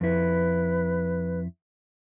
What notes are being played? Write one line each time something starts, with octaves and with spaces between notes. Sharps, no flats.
F2 E4 B4